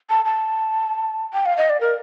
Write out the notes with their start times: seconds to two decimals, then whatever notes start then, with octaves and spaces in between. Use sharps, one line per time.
0.10 A5
0.25 A5
1.33 G5
1.46 F5
1.58 D#5
1.70 D5
1.81 A#4